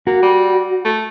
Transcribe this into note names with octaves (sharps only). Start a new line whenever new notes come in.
A#3 F#4
G3
A3